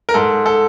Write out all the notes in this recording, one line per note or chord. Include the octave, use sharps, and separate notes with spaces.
A#4
G#2 A4
A4